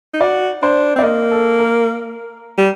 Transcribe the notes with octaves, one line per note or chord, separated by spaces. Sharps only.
D#4
F#4 D5
D4 C5
C4
D5
A#3 D#5
A4
A#4
G3